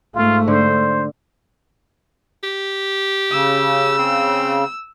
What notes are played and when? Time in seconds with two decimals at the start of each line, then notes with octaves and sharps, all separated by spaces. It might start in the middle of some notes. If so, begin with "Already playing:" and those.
0.15 G#2 A3 F4
0.48 D3 C5
2.44 G4
3.32 C#3 E6
3.99 C4